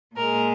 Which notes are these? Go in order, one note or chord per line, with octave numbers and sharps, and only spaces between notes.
A#2 G#3 A#4